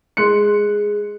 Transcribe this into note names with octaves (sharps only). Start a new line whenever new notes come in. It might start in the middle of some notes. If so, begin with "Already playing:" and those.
G#3 C6 F#6 C#7